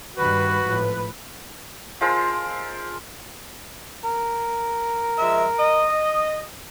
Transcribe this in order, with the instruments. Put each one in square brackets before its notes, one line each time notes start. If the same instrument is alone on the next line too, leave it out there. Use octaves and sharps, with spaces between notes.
[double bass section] G2 D#3 G3 [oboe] F#4 [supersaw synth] B4
[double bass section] G#1 A2 F3
[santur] F3 G#3 A#4 E6
[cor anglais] A#4
[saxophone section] F3 G#3 E5
D#5